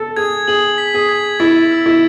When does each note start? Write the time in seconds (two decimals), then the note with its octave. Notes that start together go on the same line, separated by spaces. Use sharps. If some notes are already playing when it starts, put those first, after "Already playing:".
Already playing: A4
0.17 G#4 G#6
0.48 G#4 F#7
0.78 B6
0.94 G#4
1.09 G#6
1.40 E4 A6
1.72 E6
1.86 E4